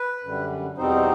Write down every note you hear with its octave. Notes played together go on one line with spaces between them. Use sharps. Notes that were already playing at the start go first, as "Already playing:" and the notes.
Already playing: B4
F#2 D3 G3
E2 B2 G3 C4 D#4 C5